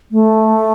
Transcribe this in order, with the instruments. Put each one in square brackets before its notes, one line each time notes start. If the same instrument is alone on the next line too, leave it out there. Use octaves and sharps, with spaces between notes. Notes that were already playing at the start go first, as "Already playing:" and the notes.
[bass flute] A3